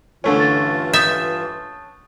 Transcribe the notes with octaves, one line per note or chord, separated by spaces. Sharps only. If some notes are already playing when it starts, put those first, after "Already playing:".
G2 D3 E3 A3 C#4 F4
A6
E5 D#6 G6 A6